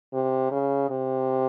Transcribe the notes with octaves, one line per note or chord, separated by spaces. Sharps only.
C3
C#3
C3